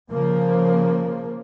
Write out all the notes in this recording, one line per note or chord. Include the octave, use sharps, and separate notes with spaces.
C#3 F3 A#3